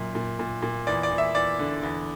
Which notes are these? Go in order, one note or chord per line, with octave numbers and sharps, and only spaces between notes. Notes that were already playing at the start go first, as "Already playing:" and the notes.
Already playing: F#2 A#2
A#2
A#2
A#2
E2 D5
D5
E2
E5
E2 D5
D3
E2